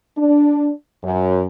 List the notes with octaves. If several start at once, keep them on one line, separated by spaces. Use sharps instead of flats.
D4
F#2